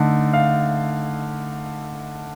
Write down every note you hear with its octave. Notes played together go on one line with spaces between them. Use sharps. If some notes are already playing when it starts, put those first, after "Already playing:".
Already playing: D3 A3 D#4
F5